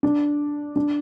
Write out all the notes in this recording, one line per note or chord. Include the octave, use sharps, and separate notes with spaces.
D4
D4